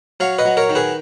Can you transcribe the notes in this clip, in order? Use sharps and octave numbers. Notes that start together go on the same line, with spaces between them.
F#3 C#5 F5
B4 D#5
F#3
A#4 C#5
D#3
G#4 B4